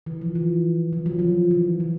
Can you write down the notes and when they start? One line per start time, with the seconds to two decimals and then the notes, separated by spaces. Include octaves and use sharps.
0.06 E3
0.21 F3
0.35 E3
0.93 F3
1.06 F#3
1.19 F3
1.51 E3
1.80 F3